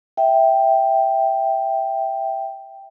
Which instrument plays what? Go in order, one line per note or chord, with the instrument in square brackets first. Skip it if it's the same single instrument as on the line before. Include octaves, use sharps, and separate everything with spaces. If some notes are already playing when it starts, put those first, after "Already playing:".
[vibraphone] E5 G5